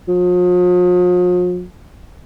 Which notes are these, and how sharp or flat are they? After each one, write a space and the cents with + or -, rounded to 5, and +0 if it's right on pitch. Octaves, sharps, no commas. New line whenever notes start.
F3 +45